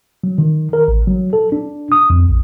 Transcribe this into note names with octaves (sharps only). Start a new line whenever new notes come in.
F#3
D#3
A#4
A1
F#3
A4
D4
D#6
F2
A#1